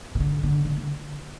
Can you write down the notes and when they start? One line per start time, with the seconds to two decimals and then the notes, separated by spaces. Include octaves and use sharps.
0.15 C3
0.20 D3
0.43 D3
0.65 D3
0.76 D3